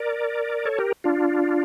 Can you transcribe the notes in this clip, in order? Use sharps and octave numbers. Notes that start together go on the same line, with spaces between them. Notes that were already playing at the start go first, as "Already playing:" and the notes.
Already playing: A#4 D5
A4 C#5
G4 A#4
D4 F4